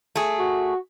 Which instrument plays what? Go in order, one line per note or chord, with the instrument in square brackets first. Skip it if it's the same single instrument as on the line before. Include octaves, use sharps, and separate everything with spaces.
[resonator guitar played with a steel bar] A3 G#4
[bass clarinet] F#4